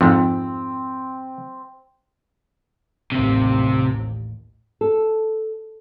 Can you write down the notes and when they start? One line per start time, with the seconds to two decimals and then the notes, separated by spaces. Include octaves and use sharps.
0.01 F2 G#2 C4
3.12 A1 D#2 C3 C4
4.81 A4